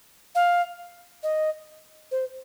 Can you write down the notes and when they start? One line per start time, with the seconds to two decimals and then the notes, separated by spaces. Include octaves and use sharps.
0.35 F5
1.23 D#5
2.11 C5